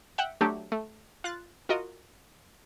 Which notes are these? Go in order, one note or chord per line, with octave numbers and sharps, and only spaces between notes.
E5 F#5 G5
F#3 A3 D4 G4
A3
F4 F#6 A6
F4 F#4 A#4 D#5